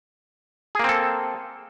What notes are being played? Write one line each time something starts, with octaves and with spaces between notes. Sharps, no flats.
A#3 C4 G#4 A4